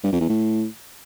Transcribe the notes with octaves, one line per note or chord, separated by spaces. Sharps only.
G2
F2
E2
A2